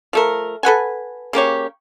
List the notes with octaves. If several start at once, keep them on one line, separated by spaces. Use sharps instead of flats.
F3 A3 A#4
A4 B4 F#5 G#5
C#3 A#3 G4 C#5